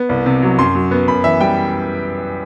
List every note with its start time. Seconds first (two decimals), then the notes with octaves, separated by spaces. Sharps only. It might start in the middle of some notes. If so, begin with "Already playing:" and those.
Already playing: B3
0.09 C2
0.26 C3
0.42 F#3
0.58 F#2 C6
0.75 F#3
0.91 B3
1.08 F#2 B5
1.24 E3 E5
1.40 G3 G5